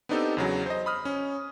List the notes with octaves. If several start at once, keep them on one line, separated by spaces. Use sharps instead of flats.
B3 C4 D4 D#4 G4 A4
E2 C#3 F#3
C5 D#5
B5 D#6 F6
C#4